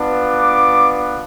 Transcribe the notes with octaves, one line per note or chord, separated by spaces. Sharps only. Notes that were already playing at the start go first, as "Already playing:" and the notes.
Already playing: B3 D4 F4
D6